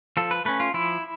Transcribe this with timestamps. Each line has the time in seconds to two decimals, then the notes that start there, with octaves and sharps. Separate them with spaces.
0.17 F3 A4
0.31 B4
0.45 A3 C#4 B4
0.60 F4
0.74 F3 E4